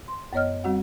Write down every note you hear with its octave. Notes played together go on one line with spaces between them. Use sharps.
C6
F#2 B3 C#5 D#5 F6
G3 C4 F#4 F#5